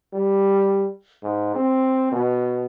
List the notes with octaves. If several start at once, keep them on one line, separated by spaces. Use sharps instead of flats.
G3
G#2
C4
B2